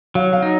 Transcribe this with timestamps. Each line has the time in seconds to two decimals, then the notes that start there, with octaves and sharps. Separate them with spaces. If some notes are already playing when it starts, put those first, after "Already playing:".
0.15 F#3 F5
0.33 F5
0.42 D#4